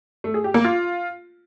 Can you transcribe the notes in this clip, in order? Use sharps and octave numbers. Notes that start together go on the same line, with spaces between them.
A3
G#4
G4
A#3
F4